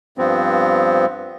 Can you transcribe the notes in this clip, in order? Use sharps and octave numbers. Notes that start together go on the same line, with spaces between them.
G2 F3 B3 C4